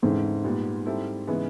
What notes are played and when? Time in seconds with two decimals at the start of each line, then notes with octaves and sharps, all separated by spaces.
0.02 E2 G#2 C#3 E3 A3 C4
0.44 A#2 G3 B3
0.86 G3 C4 E4 A4
1.27 C#3 E3 G#3 B3